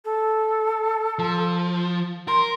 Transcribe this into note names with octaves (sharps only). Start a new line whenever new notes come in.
A4
F3
A#4 C6